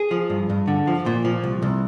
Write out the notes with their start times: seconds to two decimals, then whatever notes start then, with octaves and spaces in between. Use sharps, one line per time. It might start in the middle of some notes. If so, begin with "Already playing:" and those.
Already playing: G#4
0.11 F3
0.30 G2
0.50 G2
0.68 D3
0.87 F3
1.06 A#2
1.25 F3
1.44 C2
1.62 C2